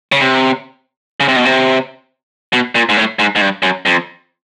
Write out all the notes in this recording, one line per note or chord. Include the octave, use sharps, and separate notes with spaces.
C#3
C3
C#3
C3
B2
C3
B2
A#2
G#2
A2
G#2
G#2
G2
F#2
F2